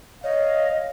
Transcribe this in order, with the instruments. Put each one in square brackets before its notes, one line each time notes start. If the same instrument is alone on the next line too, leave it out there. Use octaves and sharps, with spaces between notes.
[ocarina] C#5 [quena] D#5 [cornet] F5